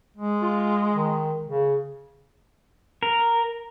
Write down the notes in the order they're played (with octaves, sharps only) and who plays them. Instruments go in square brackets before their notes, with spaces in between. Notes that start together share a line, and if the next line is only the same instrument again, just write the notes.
[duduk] G#3
[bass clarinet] F4
D#3
C#3
[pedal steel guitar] A#4